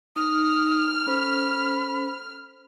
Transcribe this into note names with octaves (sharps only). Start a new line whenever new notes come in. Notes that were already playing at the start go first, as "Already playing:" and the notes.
D#4 D#6 F6
C#4 A4 C5 B5